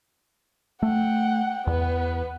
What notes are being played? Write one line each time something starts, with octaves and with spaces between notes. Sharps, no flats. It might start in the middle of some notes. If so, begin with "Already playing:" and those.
A3 F#5 G5
E2 B3 B4